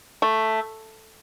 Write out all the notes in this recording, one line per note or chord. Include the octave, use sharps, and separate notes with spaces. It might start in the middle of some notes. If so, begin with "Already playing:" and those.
A3